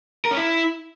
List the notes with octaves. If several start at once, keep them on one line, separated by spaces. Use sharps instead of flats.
A#4
C#4
E4